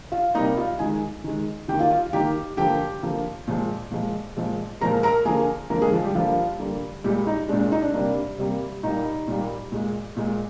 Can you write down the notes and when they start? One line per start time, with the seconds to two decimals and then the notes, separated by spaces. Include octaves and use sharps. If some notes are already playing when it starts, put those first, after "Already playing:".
0.12 F4 F5
0.35 C3 G3 A#3 D#4 D#5
0.57 F4 F5
0.79 D#3 G#3 G#4 G#5
1.24 D#3 G#3
1.68 D#3 G4 G5
1.72 A#3
1.79 F4 F5
1.91 F4 F5
2.13 D#3 A#3 G4 G5
2.57 D3 F3 A#3 G4 G5
3.03 D3 F3 A#3
3.48 A#2 F3 G#3
3.91 A#2 F3 G#3
4.36 A#2 F3 G#3
4.81 A#2 F3 G#3 A#4 A#5
5.03 A#4 A#5
5.25 D3 F3 A#3 G#4 G#5
5.70 D3 F3 A#3 A#4
5.81 G#3 G#4
5.93 F3 F4
6.04 G3 G4
6.15 D3 F3 G3 A#3 F4
6.60 D3 G3 A#3
7.04 A#2 G3 G#3 G4
7.27 D#4
7.48 G#3 D4
7.53 A#2
7.60 D4
7.72 D#4
7.83 D4
7.94 C3 G3 A#3
8.38 C3 G3 A#3
8.83 A#2 G3 A#3 D#4
9.28 A#2 G3 A#3
9.72 A#2 G#3
10.17 A#2 G#3